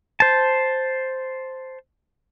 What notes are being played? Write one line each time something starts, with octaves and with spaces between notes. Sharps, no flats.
C5 A5